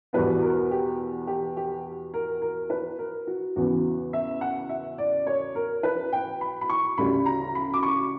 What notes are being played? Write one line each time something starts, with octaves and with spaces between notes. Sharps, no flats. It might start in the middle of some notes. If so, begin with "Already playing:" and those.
E2 B2 G3 B3 B4
A#4
G4
G4
G4
A#4
A#4
B4
A#4
F#4
E2 C#3 E3 B3 F#4
E5
F#5
E5
D5
C#5
A#4
B4
G5
B5
B5
C#6
D2 C#3 G3 B5
A#5
B5
D6
C#6